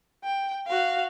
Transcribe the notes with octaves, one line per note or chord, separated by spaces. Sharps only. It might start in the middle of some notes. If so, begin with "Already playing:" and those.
G5
F#4 F5